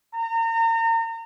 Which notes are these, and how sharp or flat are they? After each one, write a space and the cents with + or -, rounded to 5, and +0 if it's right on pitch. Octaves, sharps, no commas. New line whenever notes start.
A#5 -35